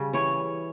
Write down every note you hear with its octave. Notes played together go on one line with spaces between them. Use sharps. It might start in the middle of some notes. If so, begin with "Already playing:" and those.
Already playing: C#3 G3
E3 C#5